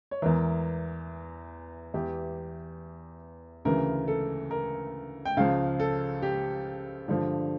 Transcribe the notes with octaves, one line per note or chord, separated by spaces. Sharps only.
C#5
E2 E3 A#4
E2 E3 G4
D2 C#3 E3 A#4
A4
A#4
G5
C#2 C#3 F3 F5
A4
G4
G2 D3 F3